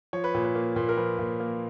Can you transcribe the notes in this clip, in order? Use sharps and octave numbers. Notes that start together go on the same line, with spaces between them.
F3 C#5
B4
A#2
B4
A#3
A#2
A#4
F3 B4
A#2
A#3